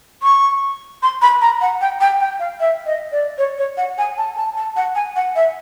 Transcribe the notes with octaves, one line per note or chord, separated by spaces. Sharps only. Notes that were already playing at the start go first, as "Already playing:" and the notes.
C#6
C6
B5
A#5
F#5
G5
G5
G5
F5
E5
D#5
D5
C#5
C#5
F#5
G#5
A5
A5
A5
F#5
G#5
F#5
E5